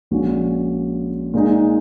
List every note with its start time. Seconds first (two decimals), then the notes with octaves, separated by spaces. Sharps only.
0.11 A#1 A#2 G#3 C#4 F#4
1.34 A#2 G#3 D#4 G#4